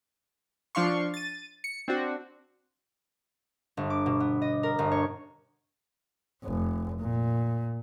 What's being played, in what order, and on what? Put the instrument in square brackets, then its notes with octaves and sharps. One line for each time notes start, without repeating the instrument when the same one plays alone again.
[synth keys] F3 D4 F5 C6 C#6
A6 D#7
C#7
C4 D4 F#4
[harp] G1
D6
B2
B3
D#5
A#4
G1
C#5
[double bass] F1
A#2